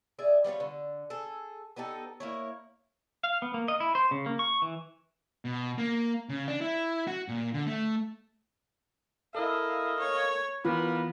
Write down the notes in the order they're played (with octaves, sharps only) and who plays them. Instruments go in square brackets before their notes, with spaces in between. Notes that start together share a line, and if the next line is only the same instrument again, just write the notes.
[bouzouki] G#4 D5 E5
G3 B3 F4 C#5
D3
G#4 A4
B3 D#4 G4 A4
A#3 E4 C#5
[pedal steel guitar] F5
B3
A#3
D#5
E4
C5
C#3
A#3
C#6
E3
[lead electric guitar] B2
A#3
C#3
D4
E4
F#4
A#2
D3
A3
[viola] E4 [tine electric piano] A4 A#4 [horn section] D#5 F5
[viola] C#5
[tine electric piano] E3 [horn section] G3 A#4 B4 [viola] B3 [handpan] F4